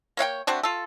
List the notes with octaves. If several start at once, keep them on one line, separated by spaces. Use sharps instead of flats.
A#3 C#5 F5 G5
A3 C4 D4 F#4
F4 A4